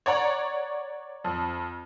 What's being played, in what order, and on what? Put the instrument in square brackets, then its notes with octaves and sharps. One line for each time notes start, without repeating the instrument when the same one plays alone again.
[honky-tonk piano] C#5 D5 F#5 A#5 C#6
F2